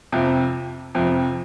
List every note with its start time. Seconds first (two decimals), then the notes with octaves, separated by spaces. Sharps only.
0.12 F2 C3 F3
0.95 F2 C3 F3